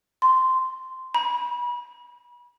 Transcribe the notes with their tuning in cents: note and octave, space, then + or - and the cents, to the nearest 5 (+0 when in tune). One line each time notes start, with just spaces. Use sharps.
C6 -10
B5 -30